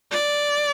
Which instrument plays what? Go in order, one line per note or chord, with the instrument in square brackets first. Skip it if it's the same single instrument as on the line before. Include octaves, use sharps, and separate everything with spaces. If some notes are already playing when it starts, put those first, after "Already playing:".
[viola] D5